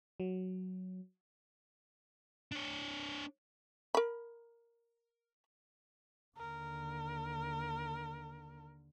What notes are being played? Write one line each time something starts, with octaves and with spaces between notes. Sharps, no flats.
F#3
D4 C#5
A#4 B5
D#2 D3 A#4